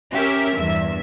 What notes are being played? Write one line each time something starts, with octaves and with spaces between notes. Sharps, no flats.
C#4 G4 A#4 E5
E2 G2 E5